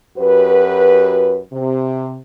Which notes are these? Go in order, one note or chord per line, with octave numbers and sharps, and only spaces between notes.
F#2 F#4 G4 B4
C3